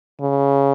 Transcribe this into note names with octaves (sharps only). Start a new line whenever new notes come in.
C#3